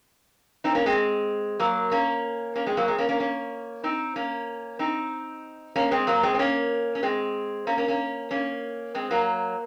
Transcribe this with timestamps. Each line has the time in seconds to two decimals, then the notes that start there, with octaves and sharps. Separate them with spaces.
0.64 C4 D#4
0.75 A#3 C#4
0.86 G#3 C4
1.59 F#3 A#3
1.91 A#3 C#4
2.55 A#3 C#4
2.66 G#3 C4
2.77 F#3 A#3
2.88 G#3 C4
2.98 A#3 C#4
3.09 A#3 C#4
3.20 A#3 C#4
3.84 C4 D#4
4.16 A#3 C#4
4.79 C4 D#4
5.76 A#3 C#4
5.91 G#3 C4
6.07 F#3 A#3
6.23 G#3 C4
6.34 C4
6.39 A#3 C#4
6.95 C#4
7.03 G#3 C4
7.67 A#3 C#4
7.77 A#3 C#4
7.88 A#3 C#4
8.31 A#3 C#4
8.95 G#3 C4
9.11 F#3 A#3